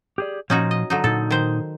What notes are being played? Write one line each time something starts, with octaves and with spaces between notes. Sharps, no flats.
G4 G#4 D5
A#2 F3 C#4 D#4 F#4
D#5
D3 F#3 D#4
A#2 D#4 A4
D#3 C5